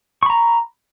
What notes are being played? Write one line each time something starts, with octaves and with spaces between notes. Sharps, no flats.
A#5 B5 C#6